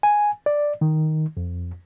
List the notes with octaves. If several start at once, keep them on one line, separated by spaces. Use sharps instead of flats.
G#5
D5
D#3
F2